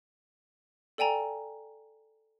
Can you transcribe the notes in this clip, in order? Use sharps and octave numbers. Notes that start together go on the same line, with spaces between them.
A4 D5 G5 G#5 A#5